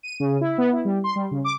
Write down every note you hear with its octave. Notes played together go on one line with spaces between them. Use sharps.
D#7
C#3
E4
B3
E4
G3
C6
G3
C#3
D6